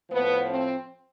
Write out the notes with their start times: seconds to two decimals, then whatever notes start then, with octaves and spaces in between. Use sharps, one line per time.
0.10 A2 F3 B3
0.47 C4